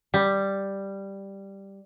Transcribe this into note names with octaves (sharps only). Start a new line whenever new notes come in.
G3